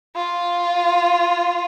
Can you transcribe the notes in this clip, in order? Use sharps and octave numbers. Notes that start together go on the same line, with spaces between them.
F4